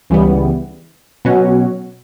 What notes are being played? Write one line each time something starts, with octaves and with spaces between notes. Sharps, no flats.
C#2 C#3 E3 G3 B3
B2 F#3 C#4 F#4